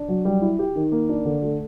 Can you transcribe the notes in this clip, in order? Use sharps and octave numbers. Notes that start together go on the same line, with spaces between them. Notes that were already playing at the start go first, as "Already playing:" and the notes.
Already playing: D4
F#3
G3
E4
G4
D#3
A#3
D4
D3
A3